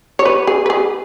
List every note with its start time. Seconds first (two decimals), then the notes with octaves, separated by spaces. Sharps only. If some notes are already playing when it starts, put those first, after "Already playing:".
0.19 C#5
0.25 B4
0.47 G#4
0.66 B4
0.70 G#4